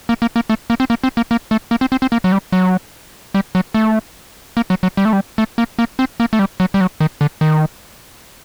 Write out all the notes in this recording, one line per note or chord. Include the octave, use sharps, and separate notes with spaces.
A#3
A#3
A#3
A3
A#3
C4
A#3
C4
A#3
A#3
A3
A#3
C4
C4
C4
A#3
F#3
G3
F#3
G3
F#3
A3
A#3
F#3
F#3
G3
A3
G3
A3
A#3
A#3
C4
A#3
A3
G3
F#3
G3
F#3
D#3
D3
D#3